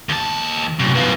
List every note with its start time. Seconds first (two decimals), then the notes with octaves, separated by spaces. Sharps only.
0.09 D#2 A5
0.79 F#2 A2 C3
0.95 F#2 B2 B4 F5